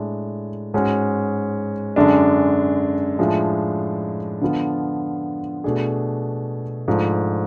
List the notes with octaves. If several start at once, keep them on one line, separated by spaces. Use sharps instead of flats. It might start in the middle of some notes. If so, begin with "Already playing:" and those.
Already playing: A2 G#3 D4
G#2 G#3 C#4 F#4
F#2 D3 G#3 D4
A2 F3 G#3 D4
D3 F3 B3 F4
B2 A3 D4 G#4
G#2 F3 A3 D4